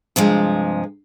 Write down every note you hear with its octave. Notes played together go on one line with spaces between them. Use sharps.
G2 C3 F3 G#3